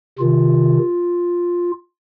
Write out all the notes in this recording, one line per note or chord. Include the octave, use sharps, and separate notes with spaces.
C3 D#3 F4